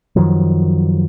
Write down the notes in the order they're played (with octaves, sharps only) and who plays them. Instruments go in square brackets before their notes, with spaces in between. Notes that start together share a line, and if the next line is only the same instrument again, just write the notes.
[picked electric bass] F#2 D#3 F3 F#3